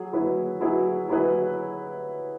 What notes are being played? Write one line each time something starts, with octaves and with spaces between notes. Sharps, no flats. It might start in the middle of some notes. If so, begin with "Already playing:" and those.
Already playing: F#3 G#4
F#3 E4 G#4 B4
F#3 E4 G#4 B4
F#3 E4 G#4 B4